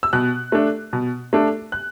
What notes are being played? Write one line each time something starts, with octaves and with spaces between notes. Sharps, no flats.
E6
B2 F#6
A3 D4
B2
A3 D4
F#6